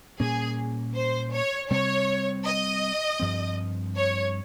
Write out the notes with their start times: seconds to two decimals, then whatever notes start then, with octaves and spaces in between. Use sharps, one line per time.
0.20 A#2 G3 A#3 C#4 G#4
0.95 C5
1.32 C#5
1.70 C3 G3 C4 C#5
2.45 D#5
3.20 G2 F3 C4
3.95 C#5